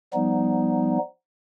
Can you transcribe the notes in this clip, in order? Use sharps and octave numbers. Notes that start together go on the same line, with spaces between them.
F3 G3 B3 D#4